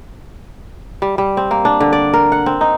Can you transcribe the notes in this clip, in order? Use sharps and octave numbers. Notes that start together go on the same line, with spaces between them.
G3
G3
C4
A#3
D4
D3
D5
A#4
F#5
C4
D#4